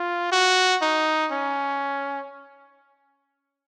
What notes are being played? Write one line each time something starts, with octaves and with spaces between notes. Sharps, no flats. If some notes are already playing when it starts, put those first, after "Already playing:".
Already playing: F4
F#4
D#4
C#4